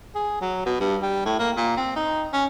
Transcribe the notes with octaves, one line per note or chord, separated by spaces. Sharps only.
G#4
F#3
B2
G2
G3
A2
A#3
A#2
C4
D#4
C#4